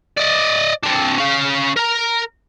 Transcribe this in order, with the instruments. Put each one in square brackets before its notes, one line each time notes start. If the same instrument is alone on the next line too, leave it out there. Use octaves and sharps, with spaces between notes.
[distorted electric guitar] D5 D#5
C4 D4
C#4 F5
A#4 A#5